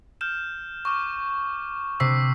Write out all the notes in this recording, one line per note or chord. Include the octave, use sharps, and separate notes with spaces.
F6 G6 E7
C#6 D6 F6
C3 E6 B6 C7